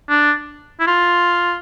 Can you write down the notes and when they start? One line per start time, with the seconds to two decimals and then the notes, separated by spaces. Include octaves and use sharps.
0.09 D4
0.80 E4
0.87 F4